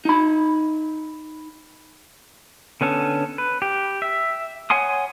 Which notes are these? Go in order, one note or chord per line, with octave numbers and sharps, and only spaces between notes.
D#4 B5
D3 B3 C#4 A4
B4
G4
E5
C#5 F#5 G#5 C6 D#6